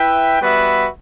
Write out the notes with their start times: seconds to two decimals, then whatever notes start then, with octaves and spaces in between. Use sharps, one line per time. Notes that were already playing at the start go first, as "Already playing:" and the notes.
Already playing: E4 B4 E5 G5
0.40 G3 B3 F#4 B4 E5